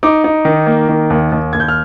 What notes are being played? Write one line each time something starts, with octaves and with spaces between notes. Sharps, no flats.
D#4 D6
D#4
D#3
A#3
D#3
D#2
D#2
D#2 G#6
G6
F6